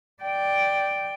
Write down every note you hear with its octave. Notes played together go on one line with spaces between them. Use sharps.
D5 G5